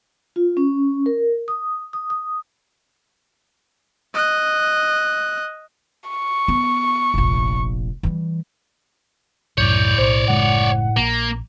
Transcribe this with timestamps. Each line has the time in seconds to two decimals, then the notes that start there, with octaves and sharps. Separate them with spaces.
0.36 F4
0.57 C#4
1.06 A#4
1.48 D#6
1.93 D#6
2.10 D#6
4.14 D#5 F#6
6.10 C#6
6.48 B3
7.14 F1 A#1
8.03 E3 G3
9.58 C2 F#2 A2 C#5 D5 G6
9.98 B1 C5
10.28 F#1 C#3 G#3 F#5
10.97 A#1 A#3